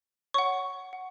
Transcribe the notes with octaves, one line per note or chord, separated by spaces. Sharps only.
C#5 F#5 C#6
F#5